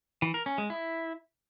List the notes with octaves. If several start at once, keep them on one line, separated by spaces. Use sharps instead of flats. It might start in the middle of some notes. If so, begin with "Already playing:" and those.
E3
A#4
C#4
G#3
E4